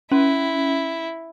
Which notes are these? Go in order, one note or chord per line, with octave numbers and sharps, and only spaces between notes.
C#4 E4